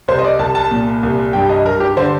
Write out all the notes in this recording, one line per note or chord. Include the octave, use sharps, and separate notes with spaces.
C2 C5
D#5
D5
C2 A5
A5
A#2
C2
G2 G5
D#5
G2 A#4
G4
D3 C5